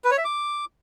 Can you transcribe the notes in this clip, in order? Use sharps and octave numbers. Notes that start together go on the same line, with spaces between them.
B4
C#5
E5
D6